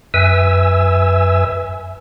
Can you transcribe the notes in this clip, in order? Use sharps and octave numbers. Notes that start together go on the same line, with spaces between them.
F#2 B4 E5 G#5 E6